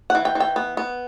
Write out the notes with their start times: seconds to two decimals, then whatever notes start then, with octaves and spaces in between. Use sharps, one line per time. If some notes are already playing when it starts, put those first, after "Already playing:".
0.10 E3 F#5
0.25 G5
0.35 E3
0.40 G5
0.56 B3
0.77 B3